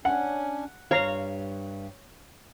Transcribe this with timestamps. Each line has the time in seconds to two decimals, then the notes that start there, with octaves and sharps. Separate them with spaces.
0.05 C#4 D4 F#5 G#5
0.91 G2 C#5 F5 A#5